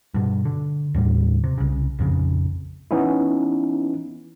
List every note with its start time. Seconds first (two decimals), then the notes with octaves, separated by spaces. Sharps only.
0.14 G2 B2
0.45 D3
0.94 D#2 A2 D3 G3
1.44 C3
1.58 C2 C#3
1.99 A#1 F2 C#3
2.91 E3 B3 C#4 D#4 E4